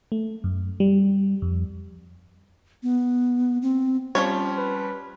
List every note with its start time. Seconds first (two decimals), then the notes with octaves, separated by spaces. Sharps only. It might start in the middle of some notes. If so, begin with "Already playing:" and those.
0.12 A3
0.44 F#2
0.80 G3
1.42 F2
2.83 B3
3.62 C4
4.15 F3 G3 C#4 F4 C#5
4.57 B4